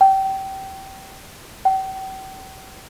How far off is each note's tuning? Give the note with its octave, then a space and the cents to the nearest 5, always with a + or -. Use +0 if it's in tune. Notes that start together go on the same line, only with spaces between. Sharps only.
G5 -25
G5 -40